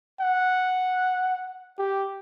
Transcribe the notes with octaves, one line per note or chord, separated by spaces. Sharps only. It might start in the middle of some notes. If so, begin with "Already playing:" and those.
F#5
G4